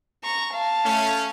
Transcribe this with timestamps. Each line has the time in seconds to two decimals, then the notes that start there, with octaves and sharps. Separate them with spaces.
0.23 A#5 C#6
0.53 F5 A5
0.85 A3 C#4